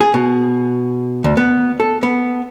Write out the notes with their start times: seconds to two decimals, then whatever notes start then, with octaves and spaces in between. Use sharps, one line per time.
0.01 G#4
0.14 B2
1.24 D2
1.37 B3
1.80 A4
2.03 B3